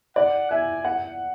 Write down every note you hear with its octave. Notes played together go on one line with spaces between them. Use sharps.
D5 F#5
E5 G#5
F#5